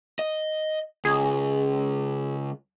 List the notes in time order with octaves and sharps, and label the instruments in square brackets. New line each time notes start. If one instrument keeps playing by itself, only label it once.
[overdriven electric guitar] D#5
[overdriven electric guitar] C#2 [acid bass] G#4